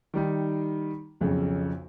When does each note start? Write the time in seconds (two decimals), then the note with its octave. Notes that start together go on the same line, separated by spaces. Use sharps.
0.14 D#3 G3 D#4
1.21 B1 F2 C#3